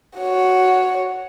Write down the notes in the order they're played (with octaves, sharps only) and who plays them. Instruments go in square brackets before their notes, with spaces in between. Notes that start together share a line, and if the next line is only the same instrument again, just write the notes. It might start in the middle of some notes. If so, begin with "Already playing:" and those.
[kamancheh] F#4 C#5